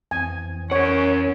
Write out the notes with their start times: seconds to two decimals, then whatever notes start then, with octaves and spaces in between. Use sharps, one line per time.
0.11 F2 E3 C4 G#5
0.72 C#4 A#4 C#5 F#5